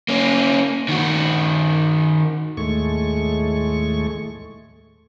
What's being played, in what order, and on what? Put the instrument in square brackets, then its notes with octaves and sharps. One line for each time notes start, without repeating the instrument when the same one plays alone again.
[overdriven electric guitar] A#3 C#4
D#3 F#4
[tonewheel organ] D#2 A2 G#3 A3 C#6